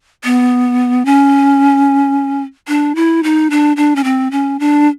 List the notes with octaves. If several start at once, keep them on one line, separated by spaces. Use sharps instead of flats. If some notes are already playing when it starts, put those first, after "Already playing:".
B3
C#4
D4
E4
D#4
D4
D4
C#4
C4
C#4
D4